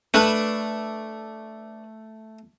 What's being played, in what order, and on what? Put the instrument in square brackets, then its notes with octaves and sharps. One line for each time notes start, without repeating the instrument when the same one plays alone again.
[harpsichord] A3 [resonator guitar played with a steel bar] D4 B4 A5